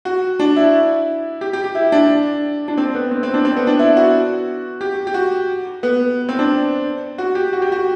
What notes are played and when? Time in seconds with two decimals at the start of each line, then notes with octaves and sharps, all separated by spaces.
0.05 F#4
0.40 D4
0.56 E4
1.41 G4
1.53 G4
1.64 G4
1.75 E4
1.92 D4
2.68 D4
2.78 C4
2.95 B3
3.11 C4
3.23 C4
3.34 D4
3.45 C4
3.56 B3
3.67 D4
3.79 E4
3.97 F#4
4.81 G4
5.07 G4
5.14 F#4
5.83 B3
6.29 C4
6.39 D4
7.18 F#4
7.35 G4
7.53 F#4
7.62 G4
7.72 F#4